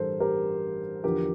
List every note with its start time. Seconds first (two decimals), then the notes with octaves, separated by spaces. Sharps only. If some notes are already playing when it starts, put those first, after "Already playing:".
Already playing: A1 G2 E3 G3 A4 A#4 C5
0.20 G4 A#4
1.04 E2 D3 F3 G4 A#4